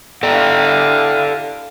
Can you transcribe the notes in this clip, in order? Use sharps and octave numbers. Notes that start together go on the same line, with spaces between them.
E4 G4 A4 D5 F5 G5